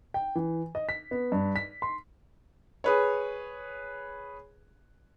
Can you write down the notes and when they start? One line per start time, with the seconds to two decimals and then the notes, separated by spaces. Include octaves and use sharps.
0.14 G5
0.35 E3
0.75 D#5
0.89 B6
1.11 B3
1.32 G2
1.56 B6
1.82 C6
2.84 G#4 B4 C#5